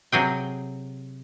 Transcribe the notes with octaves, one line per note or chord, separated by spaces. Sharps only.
C3 F#3 G#4 G5